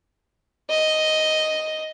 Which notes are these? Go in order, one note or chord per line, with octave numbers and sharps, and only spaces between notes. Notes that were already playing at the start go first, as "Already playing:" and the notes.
D#5